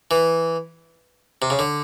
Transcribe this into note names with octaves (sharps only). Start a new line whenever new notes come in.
E3
C3
C#3
D3